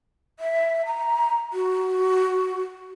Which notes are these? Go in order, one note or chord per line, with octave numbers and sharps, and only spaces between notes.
E5
A#5
F#4